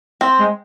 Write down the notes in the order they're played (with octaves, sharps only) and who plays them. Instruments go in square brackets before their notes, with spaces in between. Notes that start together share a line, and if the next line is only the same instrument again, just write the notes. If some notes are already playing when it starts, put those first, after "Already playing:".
[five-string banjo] C4
[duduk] G#3